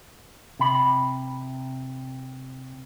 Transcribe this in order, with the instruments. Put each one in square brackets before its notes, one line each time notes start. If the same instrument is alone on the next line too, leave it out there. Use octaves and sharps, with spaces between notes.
[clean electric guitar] C3 B5